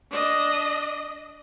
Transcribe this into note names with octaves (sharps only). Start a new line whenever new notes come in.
D4 D#5